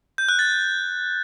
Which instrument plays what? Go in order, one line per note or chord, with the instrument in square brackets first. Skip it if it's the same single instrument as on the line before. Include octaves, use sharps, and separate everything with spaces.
[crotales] G6
F#6
A6